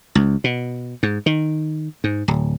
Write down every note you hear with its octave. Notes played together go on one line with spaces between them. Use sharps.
C#2
B2
G#2
D#3
G#2
D1